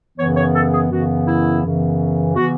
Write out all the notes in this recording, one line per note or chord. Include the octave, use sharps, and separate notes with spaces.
F#2 C#3 E3 B3 C#5
C#5
A4
G#4
F#2 C#3 E3 B3 F#4
E4
F#2 C#3 E3 B3
C#3 E3 B3 F#4